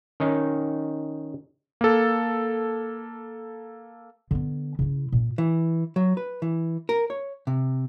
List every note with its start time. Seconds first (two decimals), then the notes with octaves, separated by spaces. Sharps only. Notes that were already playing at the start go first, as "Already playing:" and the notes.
0.20 D#3 C#4 D#4
1.81 A#3 A4
4.31 D3 B3
4.79 C#3 E4
5.12 A#2
5.38 E3
5.96 F#3
6.17 B4
6.42 E3
6.89 A#4
7.10 C#5
7.47 C3